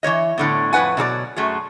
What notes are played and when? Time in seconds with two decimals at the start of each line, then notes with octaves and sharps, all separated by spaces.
0.03 E3 A3 C#5 D#5
0.38 A2 D3 B3
0.73 F2 A2 B4 F#5 G#5
0.97 B2 F#3 A4 D5
1.36 F#2 A3 F#4 G#4